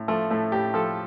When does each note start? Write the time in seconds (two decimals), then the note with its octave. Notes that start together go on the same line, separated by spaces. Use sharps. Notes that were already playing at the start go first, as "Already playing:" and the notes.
Already playing: A2
0.08 F3 A3
0.30 A2 A3
0.52 A2 G4
0.74 F3 A4